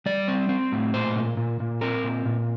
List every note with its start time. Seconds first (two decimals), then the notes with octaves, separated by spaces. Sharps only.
0.06 G3 D5
0.28 C4
0.49 C4
0.72 A2
0.94 A#2 C5
1.16 A#2
1.37 A#2
1.60 A#2
1.81 C4 A#4
2.04 A#2
2.26 A#2